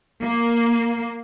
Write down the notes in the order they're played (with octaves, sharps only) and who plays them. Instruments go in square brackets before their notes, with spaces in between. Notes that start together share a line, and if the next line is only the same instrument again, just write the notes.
[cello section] A#3